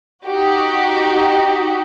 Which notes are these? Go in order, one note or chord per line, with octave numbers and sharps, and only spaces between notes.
D#4 F#4 G4